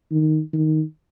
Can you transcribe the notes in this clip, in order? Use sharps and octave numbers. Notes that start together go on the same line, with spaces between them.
D#3
D#3